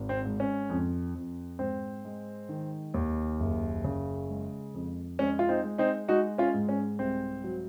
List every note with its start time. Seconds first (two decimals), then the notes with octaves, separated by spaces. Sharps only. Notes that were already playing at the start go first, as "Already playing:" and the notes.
Already playing: G#1
0.09 C4
0.25 G#2
0.40 C#4
0.70 F2
1.15 F2
1.59 G#2 C4
2.05 G#3
2.49 D#3
2.94 D#2
3.40 F#1
3.84 C#3
4.30 G#3
4.74 F2
5.19 G#3 C#4
5.39 F4
5.49 C4 D#4
5.64 G#3
5.78 C4 D#4
6.08 G#3 D#4 F#4
6.38 C#4 F4
6.54 G#2
6.69 C#4
6.99 C2 C4
7.44 F#3